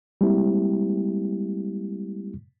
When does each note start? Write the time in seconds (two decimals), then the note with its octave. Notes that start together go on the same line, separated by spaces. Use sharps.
0.21 G3 G#3 A#3 C4 E4 G4